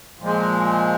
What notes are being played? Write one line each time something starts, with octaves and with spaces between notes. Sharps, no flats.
A#2 F3 G#3